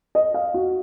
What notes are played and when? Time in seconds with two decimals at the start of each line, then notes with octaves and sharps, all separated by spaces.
0.15 D#5
0.34 F5
0.54 F#4